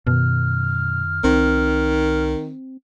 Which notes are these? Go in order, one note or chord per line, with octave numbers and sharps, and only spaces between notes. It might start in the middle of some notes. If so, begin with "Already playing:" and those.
F#2 B2 D#3 F6
C2 D#3 C4